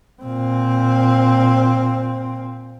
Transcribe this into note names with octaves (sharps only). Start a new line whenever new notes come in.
A#2 C4